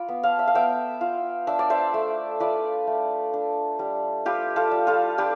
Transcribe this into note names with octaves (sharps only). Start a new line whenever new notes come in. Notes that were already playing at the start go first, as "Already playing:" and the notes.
Already playing: F4 B5 D6
B3
F5 A5
E5
F5
B3 E5 G5
F4
D4 E5
D5
C5 E5
A3
F4 B4 D5
A3
D4
G3
F4 G4 B4
F4 A4
G3
F4 A4
D4 G4 B4